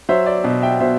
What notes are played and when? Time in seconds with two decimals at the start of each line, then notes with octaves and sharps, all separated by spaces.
0.09 F#3 C5 E5
0.26 D5
0.44 B2
0.62 E5 G5
0.80 B2 C5 E5